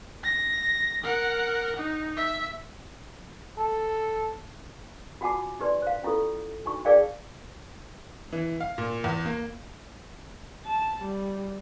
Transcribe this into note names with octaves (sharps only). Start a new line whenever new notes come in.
A#6
A#4 F#5
D#4
E5
A4
F4 F#4 F#5 G#5 A5 D6
D#4 G4 B4 D5 C6
C5 F5
C#4 E4 F4 G4 A4
D4 D#4 F#4 C#6
D#4 G#4 A#4 D5 F5 G5
E3
F5
A#2
E2
A#3
A5
G3